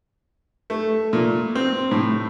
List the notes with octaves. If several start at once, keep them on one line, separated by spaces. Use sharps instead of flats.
A3
A#2
C4
A2